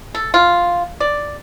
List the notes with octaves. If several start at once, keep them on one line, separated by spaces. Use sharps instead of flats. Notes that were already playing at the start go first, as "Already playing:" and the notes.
A4
F4
D5